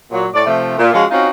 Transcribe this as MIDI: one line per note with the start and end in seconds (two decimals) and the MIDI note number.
0.11 0.26 46
0.11 0.26 54
0.34 0.43 45
0.34 0.43 74
0.46 0.78 48
0.46 0.78 53
0.46 0.78 57
0.79 0.92 46
0.94 1.04 53
0.94 1.04 56
0.94 1.04 61
0.94 1.04 65
0.94 1.04 66
1.11 1.28 60
1.11 1.28 61
1.11 1.28 63
1.11 1.28 65
1.11 1.28 66